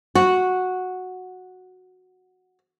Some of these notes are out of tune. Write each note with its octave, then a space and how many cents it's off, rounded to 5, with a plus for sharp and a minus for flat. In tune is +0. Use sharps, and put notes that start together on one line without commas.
F#4 -5